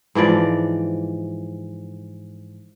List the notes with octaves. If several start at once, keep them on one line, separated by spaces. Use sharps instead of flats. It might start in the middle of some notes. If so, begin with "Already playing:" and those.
G#2 E3 F3 D5